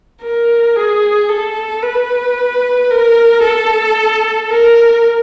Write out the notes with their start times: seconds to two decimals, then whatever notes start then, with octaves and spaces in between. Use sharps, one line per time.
0.23 A#4
0.76 G#4
1.29 A4
1.82 B4
2.90 A#4
3.43 A4
4.50 A#4